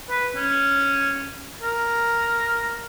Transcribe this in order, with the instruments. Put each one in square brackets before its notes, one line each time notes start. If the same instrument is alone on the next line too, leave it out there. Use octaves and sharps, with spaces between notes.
[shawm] B4
C#4
A#4